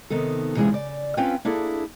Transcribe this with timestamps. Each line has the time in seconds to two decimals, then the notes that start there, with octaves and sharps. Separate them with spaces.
0.10 C3 D#3 B3 A4
0.56 C3 E3 G#3 C#4 F4 G#4
0.72 C#3 D5
1.17 C4 C#4 F4 B4 F5 G5
1.45 A#3 D4 E4 G#4 A4